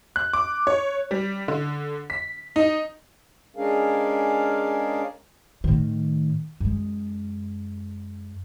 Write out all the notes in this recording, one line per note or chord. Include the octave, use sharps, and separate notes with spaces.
F#6
D6
C#5
G3
D3
B6
D#4
G#3 C#4 D4 G#4 A#4 F5
A2 D#3
F#2 G#3